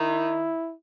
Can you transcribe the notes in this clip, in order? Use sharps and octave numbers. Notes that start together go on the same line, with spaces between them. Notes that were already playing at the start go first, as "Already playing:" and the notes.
Already playing: D#3 E4